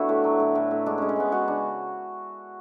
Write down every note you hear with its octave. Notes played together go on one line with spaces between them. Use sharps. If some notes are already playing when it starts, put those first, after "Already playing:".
Already playing: D3 A3 B3 D4 E4 F#4
A2
F#3
A2
A2
A2
G#3 D4
G#3 C#4
C#4
G#3 B3
G#3 F#4
C#3 D4